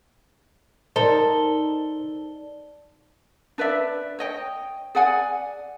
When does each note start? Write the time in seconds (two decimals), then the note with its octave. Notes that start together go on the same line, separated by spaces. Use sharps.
0.96 D#4 A4 A#4 C5 D5 G7
3.58 D4 B4 D5 E5
4.19 C#5 D#5 G5
4.95 G#4 D5 F#5 G#5